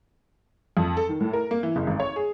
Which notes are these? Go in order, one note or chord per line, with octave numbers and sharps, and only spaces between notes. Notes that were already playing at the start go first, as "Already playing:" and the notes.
F2
A4
D#3
A2
A#4
A#3
E3
F#1
G#1
C#5
G#4